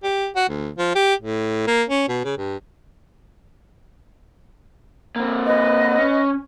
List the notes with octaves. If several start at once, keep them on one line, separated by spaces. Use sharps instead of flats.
G4
F#4
D2
F3
G4
A2
A#3
C#4
B2
C#3
G2
A#3 C4
B4 D#5
C#4